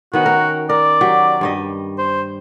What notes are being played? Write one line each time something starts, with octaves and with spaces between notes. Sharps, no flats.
D#3 B3 C#4 F#4
A#4
A#4 D5
F#3 G4
G2 G3 D#5
C5